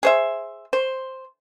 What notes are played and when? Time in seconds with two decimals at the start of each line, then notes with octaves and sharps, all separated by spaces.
0.03 G#4 C5 E5
0.73 C5